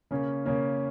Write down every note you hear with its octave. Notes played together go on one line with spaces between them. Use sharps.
C#3 A#3 C#4
C#3 A#3 C#4